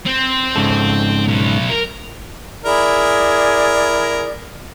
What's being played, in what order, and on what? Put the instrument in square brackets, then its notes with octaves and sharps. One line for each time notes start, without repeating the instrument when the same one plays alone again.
[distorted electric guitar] C4
[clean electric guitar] G#2 C#3 A4
[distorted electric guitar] B2 F#3
A#4
[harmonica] E4 A#4 [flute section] G#4 D5